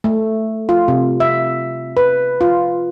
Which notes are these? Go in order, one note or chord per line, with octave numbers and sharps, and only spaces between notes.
A3
F4
C3
E5
B4
F4